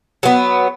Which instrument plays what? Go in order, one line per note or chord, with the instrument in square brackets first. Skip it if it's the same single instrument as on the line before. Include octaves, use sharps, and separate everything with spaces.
[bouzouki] F#3 B3